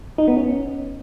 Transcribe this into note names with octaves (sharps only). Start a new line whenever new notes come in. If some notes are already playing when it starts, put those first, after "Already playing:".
D#4
B3
C#4